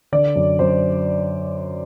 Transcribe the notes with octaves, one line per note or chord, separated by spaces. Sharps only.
D3 D5
F#2
F#2 C5